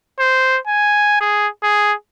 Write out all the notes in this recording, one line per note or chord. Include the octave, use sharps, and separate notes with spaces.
C5
G#5
G#4
G#4